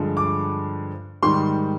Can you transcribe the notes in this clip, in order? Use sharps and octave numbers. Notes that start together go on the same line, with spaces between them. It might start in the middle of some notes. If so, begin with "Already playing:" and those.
Already playing: G2 D3 F3 G#3
D6
G#2 D#3 G3 C6